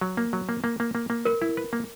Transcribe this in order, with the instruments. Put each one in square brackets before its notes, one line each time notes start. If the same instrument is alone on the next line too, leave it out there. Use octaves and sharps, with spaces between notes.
[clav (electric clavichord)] F#3
A#3
F#3
A#3
A#3
A#3
A#3
A#3
[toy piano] A#4 [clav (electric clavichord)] B4
[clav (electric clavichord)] E4
B4
A#3